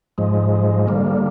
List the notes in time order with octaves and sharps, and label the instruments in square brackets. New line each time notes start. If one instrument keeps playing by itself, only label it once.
[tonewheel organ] G#2 F3 G#3
D3 G3 A#3